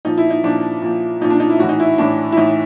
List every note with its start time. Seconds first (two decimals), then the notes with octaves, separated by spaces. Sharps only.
0.05 A#2 F3 D#4
0.18 E4
0.30 D#4
0.44 A#2 F3 D4
0.82 A#2 F3
1.21 A#2 F3 D#4
1.30 D4
1.40 D#4
1.50 E4
1.59 A2 E3 F#4
1.69 D#4
1.80 E4
1.98 A2 E3 D4
2.32 E4
2.37 A2 E3 D#4